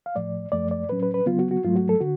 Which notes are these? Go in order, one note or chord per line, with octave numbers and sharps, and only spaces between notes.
F5
A2 F3 A3 D5
F#2 F3 A3 D5
D5
A2 F#3 C#4 B4
B4
B4
C#3 F#3 B3 F4
F#4
F#4
G#2 F#3 A3 F4
F#4
A4
D3 F#4